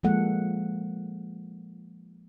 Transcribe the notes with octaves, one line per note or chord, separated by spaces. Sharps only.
F3 G#3 A#3 A4 F#5